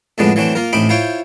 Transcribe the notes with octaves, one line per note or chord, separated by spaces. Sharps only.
F2 A2 D3 G#3 B3 D4
E3 F#3 A3 C4 D4
A#3 F4 A#4
A1 A2 C4 D#4 B5 D6
E4 F4 C5 C#5 G5